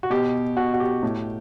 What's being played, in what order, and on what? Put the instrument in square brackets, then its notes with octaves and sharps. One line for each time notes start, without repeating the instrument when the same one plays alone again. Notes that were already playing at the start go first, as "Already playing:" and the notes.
[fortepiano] F#4
B2 G4
B2 F#4
F#4
G4
A2